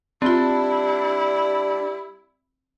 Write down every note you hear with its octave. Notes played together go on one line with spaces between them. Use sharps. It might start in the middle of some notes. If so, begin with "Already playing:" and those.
G3 C4 D4 E4 F4